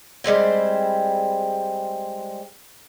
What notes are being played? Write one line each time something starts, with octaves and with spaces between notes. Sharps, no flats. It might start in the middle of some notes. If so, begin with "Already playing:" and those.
G3 G#3 C4 E4